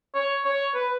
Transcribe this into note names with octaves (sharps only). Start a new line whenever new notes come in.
C#5
C#5
B4